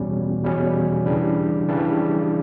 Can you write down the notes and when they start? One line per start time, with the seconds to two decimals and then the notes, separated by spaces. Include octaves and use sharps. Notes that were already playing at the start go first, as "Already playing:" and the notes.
Already playing: E2 B2 G3 C#4
0.42 E2 B2 G3 C#4
1.05 C#3 E3 G3 D4
1.69 C#3 E3 G3 D4